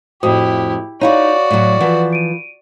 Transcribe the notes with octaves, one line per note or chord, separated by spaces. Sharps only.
F2 A2 E4 F#4 G4 C5 D#6
D#4 E4 F#4 C#5 D5 F5 F#5
A2 F#3
E3 F3 B4 F#5
D7 D#7